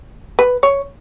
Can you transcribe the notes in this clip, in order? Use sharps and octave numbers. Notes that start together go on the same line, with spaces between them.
B4
C#5